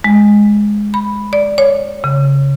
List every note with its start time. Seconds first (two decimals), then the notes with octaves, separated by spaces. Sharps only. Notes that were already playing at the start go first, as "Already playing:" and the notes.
0.04 G#3
0.94 B5
1.33 D5
1.58 C#5
2.04 C#3